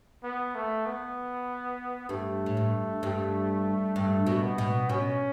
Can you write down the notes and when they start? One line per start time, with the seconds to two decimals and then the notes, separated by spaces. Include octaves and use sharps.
0.24 B3
0.55 A3
0.86 B3
2.09 G2 A3
2.46 A2
2.57 G2
3.03 G2
3.96 G2 A3
4.26 B2
4.42 B3
4.58 B2
4.89 B2 C#4